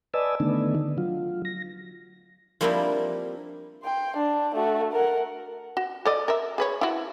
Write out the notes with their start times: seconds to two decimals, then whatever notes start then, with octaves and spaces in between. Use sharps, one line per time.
0.14 B4 D5 D#5 G#5 A5 E6
0.40 D3 D#3 A3 B3 D4 D#4
0.75 D3
0.98 F#3 F4
1.45 A#6
2.61 F3 G3 A#3 C4 D4 E4
3.83 G5 C6
4.17 D4
4.55 A3 F#4
4.92 A#4 F#5
5.77 F#4
6.05 A4 D5 D#5
6.28 A#4 E5
6.58 G#4 B4 C#5
6.81 E4 F#4